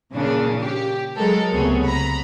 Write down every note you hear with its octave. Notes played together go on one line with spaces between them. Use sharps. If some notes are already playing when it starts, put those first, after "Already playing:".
A#2 C#3 E3 D4
G4
F#3 G#3 A4 A#4
C#2 C3 A3 B3 G#4 C#5
A#5 B5